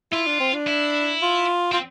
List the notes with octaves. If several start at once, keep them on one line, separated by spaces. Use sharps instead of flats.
E4 F4
D4
C4
D4
E4
F4
C4 F4